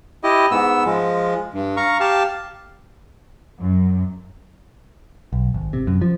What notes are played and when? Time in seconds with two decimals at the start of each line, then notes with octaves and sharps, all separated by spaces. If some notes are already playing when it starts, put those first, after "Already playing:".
0.23 E4 G4 D#5
0.51 G#2 B3 E6
0.86 F3 G#3
1.54 G2
1.77 F5 A#5 C#6
2.00 G4 F5 A5
3.60 F#2
5.33 B1
5.54 G#1
5.73 C3
5.87 F#2
6.02 F3